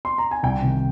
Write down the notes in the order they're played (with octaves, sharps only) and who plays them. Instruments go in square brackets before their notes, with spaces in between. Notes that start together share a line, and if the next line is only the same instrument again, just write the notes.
[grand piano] C6
A#5
G#5
C2 G5
C3 D#3